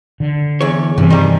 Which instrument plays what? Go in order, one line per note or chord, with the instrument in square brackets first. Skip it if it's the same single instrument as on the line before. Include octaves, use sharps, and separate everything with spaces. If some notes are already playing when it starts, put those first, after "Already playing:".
[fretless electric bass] D3
[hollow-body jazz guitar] E2 C#5
[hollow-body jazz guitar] E2 [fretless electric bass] G2 C3 E3
[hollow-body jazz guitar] D#3 G3